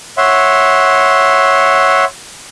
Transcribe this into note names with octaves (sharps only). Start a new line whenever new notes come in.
C#5 E5 F#5 C6